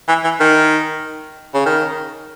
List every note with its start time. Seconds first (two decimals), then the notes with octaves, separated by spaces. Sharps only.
0.08 E3
0.24 E3
0.40 D#3
1.54 C#3
1.66 D#3